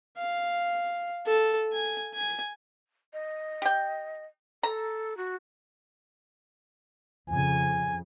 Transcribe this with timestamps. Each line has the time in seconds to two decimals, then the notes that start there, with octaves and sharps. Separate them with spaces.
0.18 F5
1.26 A4
1.73 G#5
2.14 G#5
3.13 D#5
3.62 G4 G5
4.63 A4 A#5
5.17 F#4
7.28 F2 C#3 G#5